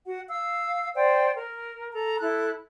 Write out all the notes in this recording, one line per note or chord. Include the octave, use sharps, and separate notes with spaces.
F#4 F#5
F5 E6
C5 D5 F#5 G5
A#4
A4 A#5
E4 A4 F#6